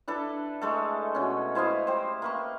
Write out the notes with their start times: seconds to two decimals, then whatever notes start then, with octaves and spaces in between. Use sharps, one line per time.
0.08 D4 E4 A4 B4
0.62 G#3 A3 A4
1.15 B2 C#4
1.55 E4 C5 D#5 F5
1.87 G4 C5
2.22 A#3 B4 C#6